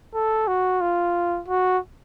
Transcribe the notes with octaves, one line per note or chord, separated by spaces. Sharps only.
A4
F#4
F4
F#4